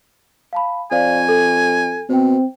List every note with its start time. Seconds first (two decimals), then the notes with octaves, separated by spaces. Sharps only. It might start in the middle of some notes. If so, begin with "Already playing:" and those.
0.53 F5 A5 B5
0.92 F2 C5 D5 F5 G#5
1.29 A4
2.10 B2 C4 C5 G5